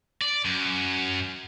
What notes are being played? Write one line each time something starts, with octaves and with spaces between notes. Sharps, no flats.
D5
F#2